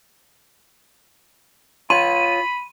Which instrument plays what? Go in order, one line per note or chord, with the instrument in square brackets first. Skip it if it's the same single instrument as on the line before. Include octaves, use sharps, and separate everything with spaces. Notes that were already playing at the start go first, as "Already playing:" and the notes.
[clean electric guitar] F4 C#5 [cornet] B5 [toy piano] C6 [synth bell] D#7